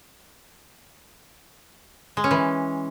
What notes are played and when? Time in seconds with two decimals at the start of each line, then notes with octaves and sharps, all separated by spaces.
2.17 G#3
2.24 C#4
2.31 E3